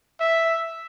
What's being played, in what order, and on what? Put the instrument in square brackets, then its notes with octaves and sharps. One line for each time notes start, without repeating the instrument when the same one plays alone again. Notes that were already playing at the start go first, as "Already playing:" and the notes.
[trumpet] E5